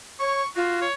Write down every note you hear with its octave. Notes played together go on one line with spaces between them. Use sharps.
C#5 C#6
F4 F#4
C#5